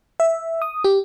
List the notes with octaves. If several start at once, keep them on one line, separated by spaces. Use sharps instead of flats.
E5
D#6
G4